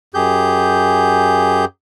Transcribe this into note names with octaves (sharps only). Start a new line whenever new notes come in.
F#2 G4 G#4 G6